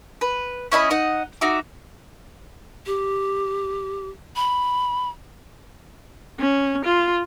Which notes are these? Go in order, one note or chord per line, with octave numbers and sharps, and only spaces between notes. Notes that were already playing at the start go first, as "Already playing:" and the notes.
B4
C#4 E4 D#5 B5
D#4 D#5 F#5
D#4 F#4 E5 D6
G4
B5
C#4
F4